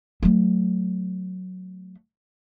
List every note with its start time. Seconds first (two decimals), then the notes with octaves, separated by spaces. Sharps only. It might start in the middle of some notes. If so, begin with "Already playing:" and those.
0.23 F#3 A3